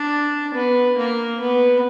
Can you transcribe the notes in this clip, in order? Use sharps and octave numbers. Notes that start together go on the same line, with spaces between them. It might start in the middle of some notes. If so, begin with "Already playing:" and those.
Already playing: D4
B3
A#3
B3